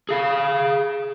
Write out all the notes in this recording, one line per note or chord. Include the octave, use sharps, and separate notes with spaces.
G#4 F5